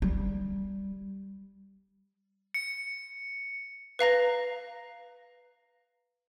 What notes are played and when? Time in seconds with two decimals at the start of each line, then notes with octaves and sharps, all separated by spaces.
0.02 G3
2.54 C#7
3.99 B4 F5 A#5 A#6